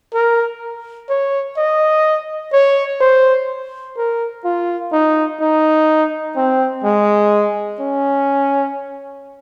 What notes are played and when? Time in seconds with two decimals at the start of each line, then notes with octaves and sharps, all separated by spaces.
0.14 A#4
1.09 C#5
1.57 D#5
2.53 C#5
3.01 C5
3.97 A#4
4.45 F4
4.93 D#4
5.40 D#4
6.36 C4
6.84 G#3
7.80 C#4